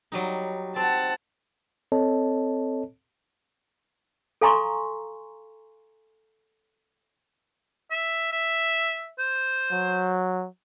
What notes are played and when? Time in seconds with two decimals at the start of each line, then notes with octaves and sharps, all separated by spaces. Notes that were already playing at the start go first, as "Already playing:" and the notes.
0.12 F#3 G3 D#4
0.76 C4 F#5 A5
1.92 C4 A4 C#5 D#5 A5
4.41 A4 F5 G#5 A#5 C6 C#6
7.91 E5
8.32 E5
9.19 C5
9.72 F#3